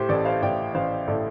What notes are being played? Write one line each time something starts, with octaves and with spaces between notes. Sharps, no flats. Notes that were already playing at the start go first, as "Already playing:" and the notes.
Already playing: A2 G4 C5
A1 A4 D5
C5 F5
A2 D5 G5
A1 C5 F5
A2 A4 D5